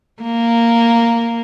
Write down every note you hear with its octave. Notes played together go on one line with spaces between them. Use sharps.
A#3